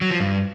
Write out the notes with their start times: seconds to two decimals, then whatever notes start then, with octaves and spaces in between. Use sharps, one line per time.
0.01 F#3
0.11 F3
0.20 G2